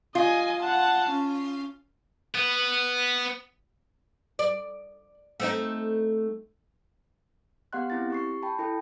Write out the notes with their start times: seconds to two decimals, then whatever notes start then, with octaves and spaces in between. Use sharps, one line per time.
0.15 F4 D#5 G#5
0.62 F#5 A5
1.10 C#4
2.35 B3
4.39 D5
5.40 A3 C4 D#4
7.73 B3 G4 F5 F#5 C6 F#6
7.90 C4 E4 A6
8.10 G4 C#6 C7
8.42 G5 A5 B5
8.59 E4 A4 G5